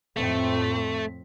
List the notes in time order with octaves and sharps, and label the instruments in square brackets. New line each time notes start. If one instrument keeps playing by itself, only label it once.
[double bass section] F2 A2 C4 [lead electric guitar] A3